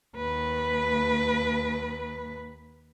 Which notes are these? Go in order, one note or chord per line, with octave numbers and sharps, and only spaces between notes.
D#2 B4